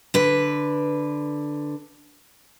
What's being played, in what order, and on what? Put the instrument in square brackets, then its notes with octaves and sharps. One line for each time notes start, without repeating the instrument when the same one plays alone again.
[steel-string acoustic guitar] D3 B4